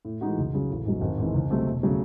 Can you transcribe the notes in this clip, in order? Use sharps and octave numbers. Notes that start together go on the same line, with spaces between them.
A2
E3 G#3 D#4 F#4
C#2
C#3 F#3
A1
G#2 F#3
G#1
G#2 E3 C4
C#2
C3 F#3 A3 C4
E1
C#3 F#3 A3